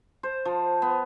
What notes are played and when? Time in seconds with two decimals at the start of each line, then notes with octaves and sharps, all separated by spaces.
0.23 C5
0.45 F3
0.82 B3